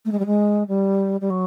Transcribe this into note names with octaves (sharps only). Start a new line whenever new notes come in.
A3
G#3
G3
G#3
G3
G3
F#3